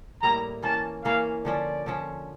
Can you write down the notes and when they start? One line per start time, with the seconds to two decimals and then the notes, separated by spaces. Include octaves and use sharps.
0.22 A2 G3 A#3 E4 A#5
0.63 E3 A#3 C#4 A5
1.04 E3 A#3 C#4 F5
1.45 D3 F3 C#4 D5
1.86 D3 F3 C#4